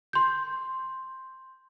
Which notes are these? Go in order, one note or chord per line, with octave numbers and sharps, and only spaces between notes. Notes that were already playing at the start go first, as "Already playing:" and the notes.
C6 G6